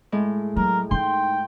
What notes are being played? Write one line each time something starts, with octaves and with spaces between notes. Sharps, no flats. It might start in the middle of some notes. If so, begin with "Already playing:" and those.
A2 G#3
F#3 A#4
D#4 E4 G5 C6